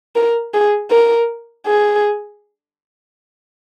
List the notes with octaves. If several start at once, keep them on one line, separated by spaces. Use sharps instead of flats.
A#4
G#4
A#4
G#4